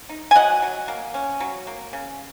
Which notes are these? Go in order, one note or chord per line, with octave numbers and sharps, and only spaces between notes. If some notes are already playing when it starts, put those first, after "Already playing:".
D#4
G#5
F#3 D#5 F#5
F#3
A#3
C#4
F#3
A#3
C#3